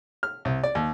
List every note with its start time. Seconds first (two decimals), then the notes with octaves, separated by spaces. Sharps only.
0.23 F6
0.45 C2
0.64 D5
0.75 D#2